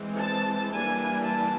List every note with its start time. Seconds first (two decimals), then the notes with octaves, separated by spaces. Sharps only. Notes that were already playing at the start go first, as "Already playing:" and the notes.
Already playing: E3 G#3 C4
0.18 A5
0.71 E3 G3 A#3 D4 G#5
1.25 A5